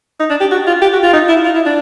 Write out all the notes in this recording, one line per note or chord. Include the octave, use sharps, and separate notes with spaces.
D#4
D4
G4
F#4
F4
G4
F#4
F4
D#4
E4
F4
E4
D4